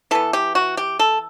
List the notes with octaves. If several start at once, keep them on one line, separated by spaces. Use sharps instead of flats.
E3 B3 A4
G4
F#4
G4
A4